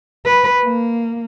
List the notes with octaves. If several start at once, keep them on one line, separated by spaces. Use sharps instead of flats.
B4
A#3